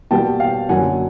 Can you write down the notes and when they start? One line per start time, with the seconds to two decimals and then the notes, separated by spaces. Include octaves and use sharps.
0.11 B2 G3 A#3 G5 A5
0.40 F5 G5
0.69 F#2 D3 F#3 A#3 F#5 G#5